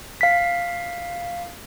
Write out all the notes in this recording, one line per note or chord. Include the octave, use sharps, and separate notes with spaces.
F5 B6